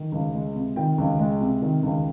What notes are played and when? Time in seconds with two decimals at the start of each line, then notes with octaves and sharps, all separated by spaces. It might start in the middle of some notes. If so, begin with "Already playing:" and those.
Already playing: D#3
0.12 C#2
0.34 G#3
0.55 C3
0.76 D#3 G5
0.98 C#2
1.19 G#3
1.41 C3
1.62 D#3
1.83 C#2